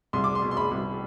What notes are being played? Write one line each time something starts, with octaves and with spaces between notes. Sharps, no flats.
C2 C6
D6
C6
B2
C6
B5
C2